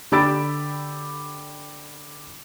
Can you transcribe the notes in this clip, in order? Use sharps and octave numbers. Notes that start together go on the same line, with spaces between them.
D3 G4 B5 E6 A6 D7